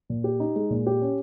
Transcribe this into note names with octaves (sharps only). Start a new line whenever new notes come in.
A#2
G4
D#4
G#3
A#2
G4
C#4